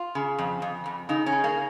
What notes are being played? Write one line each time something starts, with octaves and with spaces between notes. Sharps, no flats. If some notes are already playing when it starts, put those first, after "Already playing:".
Already playing: F4
C#3
F2
F2
F2
C#3 D#4
C#4
C#3
A#3